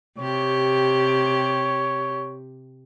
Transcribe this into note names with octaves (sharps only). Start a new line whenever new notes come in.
C3 G4 C#5